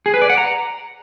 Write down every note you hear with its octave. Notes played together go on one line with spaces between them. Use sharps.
G#4
B4
D5
F#5
A#5